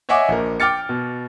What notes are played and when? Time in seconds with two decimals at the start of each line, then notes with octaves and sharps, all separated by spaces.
0.09 C#5 D#5 E5 F#5 G#5 D6
0.28 A#1 A#4
0.60 G5 D6 F6 A6 C#7
0.89 B2